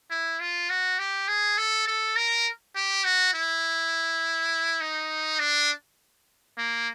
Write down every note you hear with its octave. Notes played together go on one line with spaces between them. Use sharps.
E4
F4
F#4
G4
G#4
A4
A4
A#4
G4
F#4
E4
D#4
D4
A#3